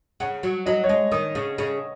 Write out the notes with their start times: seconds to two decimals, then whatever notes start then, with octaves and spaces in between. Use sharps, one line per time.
0.20 C#3 F#5
0.43 F#3
0.66 F#3 D#5
0.84 C#5
0.89 G#3 D#5
1.12 D#3 D#6
1.35 C#3
1.58 C#3